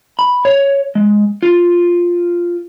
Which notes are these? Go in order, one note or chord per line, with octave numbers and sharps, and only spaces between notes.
B5
C#5
G#3
F4